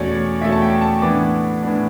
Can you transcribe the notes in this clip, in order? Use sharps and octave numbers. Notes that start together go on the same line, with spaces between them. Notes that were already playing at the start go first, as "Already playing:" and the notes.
Already playing: E2 B2 A3 C#4 D5
E2 B2 A3 C#4 E5
A5
G5
A5
A2 E3 B3 D4 D6
A2 E3 B3 D4